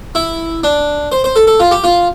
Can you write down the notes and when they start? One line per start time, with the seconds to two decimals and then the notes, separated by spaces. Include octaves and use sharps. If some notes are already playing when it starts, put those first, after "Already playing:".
0.15 E4
0.64 D4
1.12 C5
1.24 C5
1.36 A4
1.47 A4
1.60 F4
1.71 G4
1.84 F4